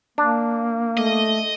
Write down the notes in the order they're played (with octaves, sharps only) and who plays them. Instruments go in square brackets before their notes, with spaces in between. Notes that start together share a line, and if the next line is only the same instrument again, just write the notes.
[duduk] A#3 [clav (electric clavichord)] D4
[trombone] A3 [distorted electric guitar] D#5